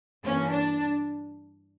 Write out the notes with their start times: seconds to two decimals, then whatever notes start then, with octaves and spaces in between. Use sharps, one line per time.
0.24 G2 E3 A#3 C#4
0.52 D4